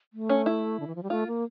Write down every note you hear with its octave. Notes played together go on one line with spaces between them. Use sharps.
A3
C#4
E4
D3
E3
F3
G3
A3 F4
A#3